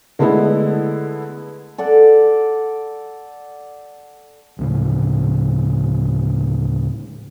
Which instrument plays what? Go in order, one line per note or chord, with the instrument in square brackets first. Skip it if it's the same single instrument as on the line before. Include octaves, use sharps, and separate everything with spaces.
[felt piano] D3 G#3 A3 B3 E4
[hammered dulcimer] A4 D5 F#5
[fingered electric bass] D2 A2 C#3